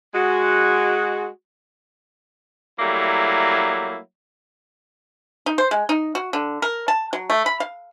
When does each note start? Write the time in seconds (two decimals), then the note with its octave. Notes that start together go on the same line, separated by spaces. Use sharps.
0.15 G#3 F#4
2.80 F#3 G3 A3 A#3 E4
5.46 D#4
5.58 C5
5.71 G#3
5.89 D#4
6.15 F#4
6.33 D3
6.62 A#4
6.88 A5
7.13 F#3
7.30 A3
7.46 B5
7.60 F5